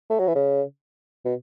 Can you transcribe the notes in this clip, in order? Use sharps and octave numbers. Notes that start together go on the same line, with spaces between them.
A3
F#3
E3
C#3
B2